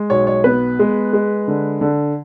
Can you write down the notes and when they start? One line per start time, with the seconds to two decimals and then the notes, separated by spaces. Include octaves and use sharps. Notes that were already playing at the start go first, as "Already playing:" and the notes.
Already playing: G#3
0.10 B1 C#5
0.27 C#5
0.44 B3 B4
0.79 G#3
1.13 G#3
1.48 D3
1.81 D3